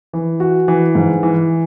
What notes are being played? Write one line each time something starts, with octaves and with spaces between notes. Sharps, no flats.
E3
F#4
E3
G#2
E3